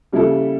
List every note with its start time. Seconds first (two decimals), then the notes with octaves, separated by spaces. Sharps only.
0.12 C#3 G3 A#3 E4 A4